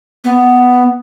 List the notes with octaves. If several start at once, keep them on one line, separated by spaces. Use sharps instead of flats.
B3